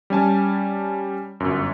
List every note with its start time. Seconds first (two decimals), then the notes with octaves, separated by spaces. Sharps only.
0.10 G3 C#4 G#5 A5
1.40 G1 F#2